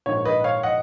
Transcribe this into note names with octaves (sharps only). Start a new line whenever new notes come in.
A#1 G#2 D#3 C#5
B4 D#5
C#5 F5
D#5 F#5